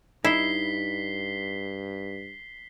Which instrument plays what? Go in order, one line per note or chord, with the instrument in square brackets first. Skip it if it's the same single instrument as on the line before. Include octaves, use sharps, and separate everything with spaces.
[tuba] G2 [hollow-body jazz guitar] D#4 D#5 [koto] E4 [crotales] B6 C7 G7